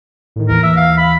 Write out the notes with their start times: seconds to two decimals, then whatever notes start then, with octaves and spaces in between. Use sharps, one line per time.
0.36 A2 D#3
0.49 D#2 E3 A#4
0.63 E5
0.77 F5
0.98 B5